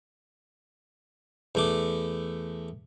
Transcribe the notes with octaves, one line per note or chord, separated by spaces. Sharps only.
E2 A3 D6